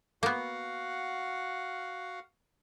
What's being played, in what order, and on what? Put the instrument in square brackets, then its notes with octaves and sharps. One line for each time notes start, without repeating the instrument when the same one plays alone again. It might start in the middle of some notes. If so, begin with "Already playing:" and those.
[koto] A#3 B3 [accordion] F#4 F5 F#5